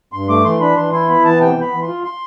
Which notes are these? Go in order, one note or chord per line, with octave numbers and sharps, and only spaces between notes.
G2 C6
A3 D6
E3 C6
D4 B5
E3 C6
E4 C6
B3 B5
E3 A5
C3 G5
B3 B5
E3
C6
F4
C6